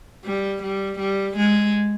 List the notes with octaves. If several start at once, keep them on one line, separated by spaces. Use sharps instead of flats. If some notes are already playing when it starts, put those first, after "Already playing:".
G3
G3
G3
G#3